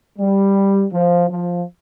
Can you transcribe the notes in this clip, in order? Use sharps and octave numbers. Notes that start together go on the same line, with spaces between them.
G3
F3
F3